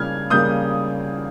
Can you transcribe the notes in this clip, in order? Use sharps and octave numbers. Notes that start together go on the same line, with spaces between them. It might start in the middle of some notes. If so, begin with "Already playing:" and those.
Already playing: C#3 G3 A#3 F6 G#6
C#3 G3 A#3 D#6 G6